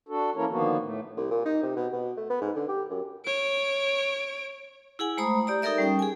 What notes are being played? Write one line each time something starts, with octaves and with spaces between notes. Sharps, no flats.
D4 F#4 A4
E3 A#3 C#4 E4 A#4 C#5
D3 D#3 F3 A#3 B3 F#4
A2 A3
C2
A#2
D#4
C3
B2
B2
A3
B3
G#2
D3
G4
F#2
C#5 D7
E4 G#4 F#5 G#5
G#3 A3 C5 A#5 B5 D#6
G4 D5 A#5
D#4 G4 A4 A#4 D5 E5
G3 C#4 G5
G#4 G#5